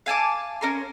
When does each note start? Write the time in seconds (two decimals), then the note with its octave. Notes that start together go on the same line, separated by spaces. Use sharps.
0.06 F5 G#5 A5 D6
0.61 C#4 A#4 C6